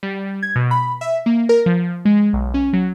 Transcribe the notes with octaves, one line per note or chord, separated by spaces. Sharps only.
G3
G#6
B2
B5
E5
A#3
A#4
F3
G#3
B1
C#4
F#3